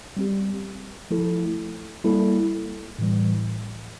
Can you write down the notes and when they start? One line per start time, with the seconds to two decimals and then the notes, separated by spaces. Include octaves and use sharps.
0.17 G3 C4 G4
1.11 F3 A3 E4 A4
2.04 G3 A#3 E4 A4
2.99 A2 E3 G3